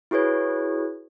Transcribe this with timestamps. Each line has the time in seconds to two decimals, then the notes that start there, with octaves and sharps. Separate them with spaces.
0.11 E4 F#4 G#4 B4 C#5